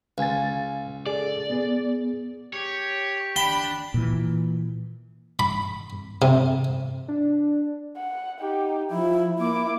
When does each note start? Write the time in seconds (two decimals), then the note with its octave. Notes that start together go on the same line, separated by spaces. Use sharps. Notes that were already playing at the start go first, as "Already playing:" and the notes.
0.18 C#2 F5 G#5 A6
1.07 G#4 A4 D5
1.50 B3 G#4
2.54 G4 C#5
3.36 D4 G5 B5
3.94 A#2 E3
5.39 B5
6.22 C3
7.08 D4
7.96 F#5
8.40 D#4 G4
8.91 F3 E4
9.39 A#3 E4 D6